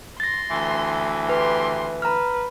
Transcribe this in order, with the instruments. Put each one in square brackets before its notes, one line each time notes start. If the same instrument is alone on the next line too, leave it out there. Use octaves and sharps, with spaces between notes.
[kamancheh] C6 [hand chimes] A6 A#6
[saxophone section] D2 E3
[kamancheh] G4 C6 [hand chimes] B4
[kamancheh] B4 [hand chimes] A#5 F6